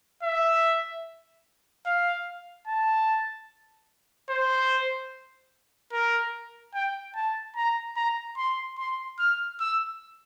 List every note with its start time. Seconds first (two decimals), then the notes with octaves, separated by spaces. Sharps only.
0.23 E5
1.86 F5
2.67 A5
4.30 C5
5.93 A#4
6.74 G5
7.15 A5
7.56 A#5
7.97 A#5
8.37 C6
8.78 C6
9.19 F6
9.60 E6